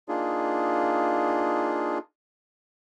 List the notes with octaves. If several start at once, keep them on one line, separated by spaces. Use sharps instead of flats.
A#3 D4 D#4 F4 G#4